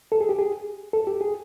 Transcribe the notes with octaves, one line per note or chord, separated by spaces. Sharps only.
A4
G#4
G4
G#4
A4
G4
G#4